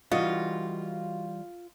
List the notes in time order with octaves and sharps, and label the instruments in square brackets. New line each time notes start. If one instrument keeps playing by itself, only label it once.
[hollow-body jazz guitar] E3 G3 [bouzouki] F4 [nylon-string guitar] F#4 D#5